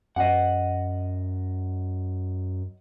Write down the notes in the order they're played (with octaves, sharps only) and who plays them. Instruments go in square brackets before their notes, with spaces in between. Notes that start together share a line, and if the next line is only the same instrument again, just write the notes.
[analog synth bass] F#2 [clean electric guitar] D#5 F#5